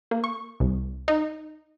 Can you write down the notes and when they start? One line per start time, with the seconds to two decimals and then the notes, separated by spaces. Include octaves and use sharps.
0.11 A#3
0.24 C#6
0.60 C2
1.08 D#4